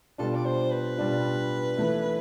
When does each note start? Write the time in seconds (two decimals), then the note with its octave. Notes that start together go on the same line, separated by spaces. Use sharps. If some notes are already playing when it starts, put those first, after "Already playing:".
0.18 B2 G3 D4 F4 A4
0.35 D5
0.45 C5
0.71 B4
0.97 B2 G3 D4 F4
1.77 E3 A3 E4